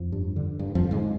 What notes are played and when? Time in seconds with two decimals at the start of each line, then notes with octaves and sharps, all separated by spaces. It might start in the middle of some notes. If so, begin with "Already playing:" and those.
Already playing: F2 F3
0.12 G2
0.36 D3
0.59 G2
0.75 F2 F3
0.84 D3
0.91 G#2 G#3